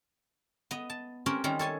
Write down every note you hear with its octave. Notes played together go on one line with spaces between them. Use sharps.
B3 D#5
A5
C4 C#4 G4 A#4 C#5
D#3 G3 C4 C#4 A#5
A4 C#5 G#5 A5